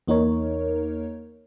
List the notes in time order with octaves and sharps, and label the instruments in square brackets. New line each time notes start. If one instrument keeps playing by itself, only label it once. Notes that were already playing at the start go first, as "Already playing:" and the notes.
[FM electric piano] E2 A#3 D#4 A#4 C#5